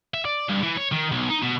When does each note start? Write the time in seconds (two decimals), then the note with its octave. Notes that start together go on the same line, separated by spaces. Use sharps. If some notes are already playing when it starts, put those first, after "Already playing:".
0.14 E5
0.25 D5
0.49 G2
0.63 E3
0.77 C#5
0.92 D#3
1.11 B1
1.29 D#4
1.42 B2